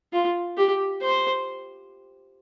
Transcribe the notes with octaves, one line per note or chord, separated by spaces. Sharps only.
F4
G4
C5